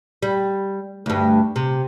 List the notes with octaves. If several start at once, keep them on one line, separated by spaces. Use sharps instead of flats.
G3
D2 G2
C3